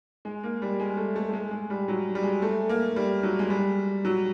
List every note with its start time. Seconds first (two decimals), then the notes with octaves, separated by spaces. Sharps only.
0.25 G#3
0.43 A#3
0.62 G3
0.80 G#3
0.97 A3
1.16 A3
1.29 A3
1.33 G#3
1.51 G#3
1.70 G3
1.88 F#3
2.15 G3
2.23 G#3
2.42 A3
2.69 A#3
2.96 G3
3.23 F#3
3.39 G#3
3.50 G3
4.05 F#3